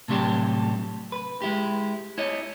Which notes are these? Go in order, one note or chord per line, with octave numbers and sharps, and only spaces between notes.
A2 C3 F#3 G3 D4 G4
B4
G#3 E4 G4
E4 C#5 D#5